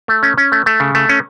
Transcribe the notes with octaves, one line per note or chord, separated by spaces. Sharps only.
A3
C#4
C#4
A3
A3
C#3
A3
C#4